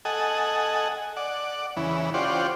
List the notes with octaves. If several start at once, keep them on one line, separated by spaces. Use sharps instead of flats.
A4 D#5 F#5 G#5
D5 F#5
E2 C#3 E3
C#4 F4 G4 C5 D5 F#5